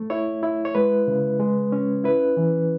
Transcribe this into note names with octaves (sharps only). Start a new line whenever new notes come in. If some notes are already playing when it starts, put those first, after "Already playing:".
Already playing: A3
E4 C#5
E4
C#5
G#3 B4
C#3
G#3
C#4
E4 B4
E3